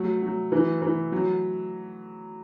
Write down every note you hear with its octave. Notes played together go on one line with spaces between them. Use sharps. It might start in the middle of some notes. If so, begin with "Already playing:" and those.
Already playing: F#3 A3
F#3
E3
E3
F#3